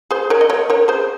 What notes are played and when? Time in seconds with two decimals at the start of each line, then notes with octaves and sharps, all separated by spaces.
0.11 G#4 C5
0.30 A#4 C#5
0.41 D#5
0.50 A#4 C#5
0.70 A#4 C#5
0.88 G#4 C5